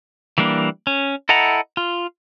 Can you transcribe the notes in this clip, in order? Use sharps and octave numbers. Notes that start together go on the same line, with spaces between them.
E3 G3 A#3 D4
C#4
E4 A4 D#5 F#5 A#5
F4